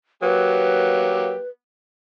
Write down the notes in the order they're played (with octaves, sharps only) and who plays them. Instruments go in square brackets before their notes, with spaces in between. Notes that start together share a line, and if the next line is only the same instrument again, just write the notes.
[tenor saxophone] F#3 [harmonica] A#3 G4 [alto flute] B4